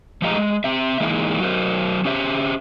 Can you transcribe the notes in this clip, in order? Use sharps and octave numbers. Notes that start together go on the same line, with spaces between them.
F3 G#3 A3 G4 D#5 A#5
G#3
C4 E5
E3 G#3 A#3 D#4 E4
F#3 F#4 A#4 C5
C#4 G4 C5 E5